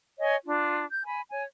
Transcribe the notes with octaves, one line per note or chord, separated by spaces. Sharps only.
C#5 D#5 G#5
D4 F4
G6
G#5 B5
C#5 G#5